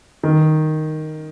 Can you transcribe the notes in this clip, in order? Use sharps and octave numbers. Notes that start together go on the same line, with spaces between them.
D#3